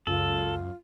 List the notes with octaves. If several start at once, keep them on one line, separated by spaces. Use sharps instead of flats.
C#2 F#2 C#3 F4 A4